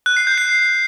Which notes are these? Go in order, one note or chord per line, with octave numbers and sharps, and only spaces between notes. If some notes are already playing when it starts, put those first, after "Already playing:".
F#6
C7
G6
C7